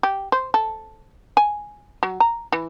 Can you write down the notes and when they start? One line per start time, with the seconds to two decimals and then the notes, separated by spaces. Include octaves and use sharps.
0.03 G4
0.32 C5
0.54 A4
1.37 G#5
2.03 F#3
2.20 A#5
2.52 E3